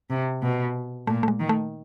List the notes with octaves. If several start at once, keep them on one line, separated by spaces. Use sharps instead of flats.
C3
B2
A#2 A3
A3
G#3
D#3
A3